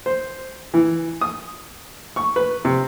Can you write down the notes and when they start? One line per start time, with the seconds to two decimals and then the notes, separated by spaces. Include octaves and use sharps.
0.06 C5
0.74 E3
1.21 D#6
2.16 C#6
2.36 B4
2.65 C3